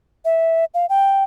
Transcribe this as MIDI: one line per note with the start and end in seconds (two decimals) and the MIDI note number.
0.25 0.65 76
0.74 0.86 77
0.89 1.24 79